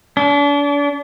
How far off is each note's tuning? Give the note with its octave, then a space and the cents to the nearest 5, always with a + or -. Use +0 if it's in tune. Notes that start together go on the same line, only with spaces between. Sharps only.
D4 -40